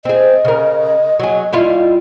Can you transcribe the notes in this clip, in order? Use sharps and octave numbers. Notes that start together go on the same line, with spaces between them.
C4 G#4 D#5
C#3 A#4
F#3 G#4
G3 E4 F4